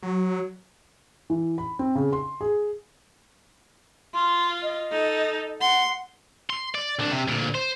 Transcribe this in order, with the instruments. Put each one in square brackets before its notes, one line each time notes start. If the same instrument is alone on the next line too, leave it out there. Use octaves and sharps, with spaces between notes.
[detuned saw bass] F#3
[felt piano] E3
B5
C4
C#3
C6
G#4
[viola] F4 [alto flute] C6
[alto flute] D#5
[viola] D#4 A4
[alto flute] F#5 [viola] C6
[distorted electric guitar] C6
D5
C2 D4
C3
D2 A#2
C5